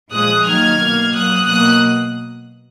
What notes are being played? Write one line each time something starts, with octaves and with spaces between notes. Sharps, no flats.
A#2 F3 G#3 D#6 F#6
D#3 F#3 A#3 F6 G#6
B2 A#3
A#2 F#3 A#3 D#6 F#6
B2 F#3 A#3 D#6 F#6